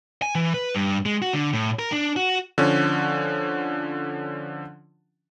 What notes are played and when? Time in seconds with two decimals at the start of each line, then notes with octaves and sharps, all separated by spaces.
0.22 G#5
0.35 E3
0.54 B4
0.75 G2
1.06 G#3
1.22 F#4
1.33 D3
1.53 A2
1.79 A#4
1.92 D4
2.16 F#4
2.58 D3 F3 C#4